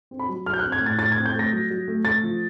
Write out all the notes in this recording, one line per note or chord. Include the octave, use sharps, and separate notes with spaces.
C4
B5
F#3
F#3 F6
G6
F#6
C4
G#6
A2 A6
A2 A6
G#6
C4
G6
A3 A#6
F#3
F#3
A3
A3 A6
F3